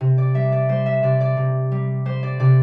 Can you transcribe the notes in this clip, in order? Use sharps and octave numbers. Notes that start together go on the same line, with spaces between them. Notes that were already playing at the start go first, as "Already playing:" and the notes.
C3
D5
G3 E5
D5
G3 C5
E5
C3 D5
D5
C3
G3
G3 C5
D5
C3 D5